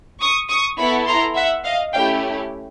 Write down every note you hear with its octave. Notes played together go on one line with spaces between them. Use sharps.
C#6 D#6
C#6 D#6
B3 E4 A4 B5 C#6
A#5 C6
E5 F#5
D#5 F5
A3 C#4 E4 G4 F5 G5